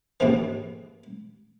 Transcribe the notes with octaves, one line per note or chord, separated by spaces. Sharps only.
A1 D#2 G#2 B2 D#3 E3